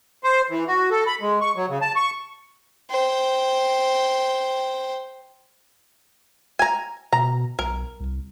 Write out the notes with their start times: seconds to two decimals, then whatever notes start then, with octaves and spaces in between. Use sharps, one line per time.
0.24 C5
0.50 E3
0.67 F#4
0.91 A4
1.07 B5
1.21 G#3
1.41 C#6
1.56 F#3
1.69 C#3
1.81 A5
1.96 C#6
2.90 C5 G5
6.59 G#5 A#5
7.13 B2 A#5
7.59 B1 A#4
8.00 C2